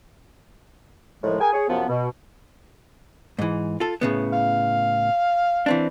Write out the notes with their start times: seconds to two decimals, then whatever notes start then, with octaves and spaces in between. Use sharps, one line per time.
1.23 C2 A2 D#3 F3 G#3
1.41 G#4 A#4 G5 G#5
1.53 G#4 C#5
1.69 F#2 C3 F3 B3
1.89 B2
3.39 G#2 E3
3.80 F4 A4
4.01 A2 C#3 B3
4.33 F5
5.66 E3 C4 D4